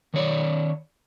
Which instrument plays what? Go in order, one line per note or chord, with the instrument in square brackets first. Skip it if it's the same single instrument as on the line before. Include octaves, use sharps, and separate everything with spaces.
[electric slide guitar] D#3 C#5 D5